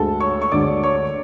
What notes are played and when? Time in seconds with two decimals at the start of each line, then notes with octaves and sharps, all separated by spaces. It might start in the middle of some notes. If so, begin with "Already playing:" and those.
Already playing: D2 D3 G#3 A4 A5
0.20 C#5 C#6
0.42 C#6
0.52 D2 D3 G#3 D5 D6
0.83 C#5 C#6